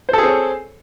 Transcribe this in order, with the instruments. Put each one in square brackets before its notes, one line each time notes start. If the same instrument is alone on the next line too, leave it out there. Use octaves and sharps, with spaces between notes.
[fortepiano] C5
A4
G#4
C4
C#5